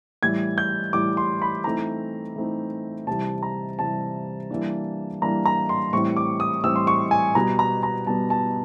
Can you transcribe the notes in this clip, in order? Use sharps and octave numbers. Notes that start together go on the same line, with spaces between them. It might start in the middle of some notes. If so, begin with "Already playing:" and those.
A2 E3 G3 G#6
G6
A2 E3 G3 D6
C6
B5
E3 A3 C4 D#4 A#5
E3 A3 C4 D#4
C3 E3 G3 A5
A#5
C3 E3 G3 A5
E3 G3 A#3 D4
E3 G3 A#3 D4 A#5
A#5
C6
A2 E3 G3 C4 C#6
D6
D#6
A2 E3 G3 C4 E6
C6
C#6
G#5
B2 G3 B3 A#5
A#5
A#5
B2 G3 B3 A5
A5